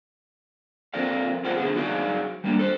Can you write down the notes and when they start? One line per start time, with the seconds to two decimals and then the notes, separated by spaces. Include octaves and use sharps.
0.94 F3 C4 A4 A#4 D5 F5
1.44 F4 G#4 C5 D5 F5 F#5
1.57 D3 B3 F#4 G#4
1.75 F#3 D#4 F#4 G#4 D5 F5
2.44 G3 A#3 D4
2.59 A4 C5